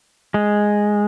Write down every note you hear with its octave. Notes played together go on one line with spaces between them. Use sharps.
G#3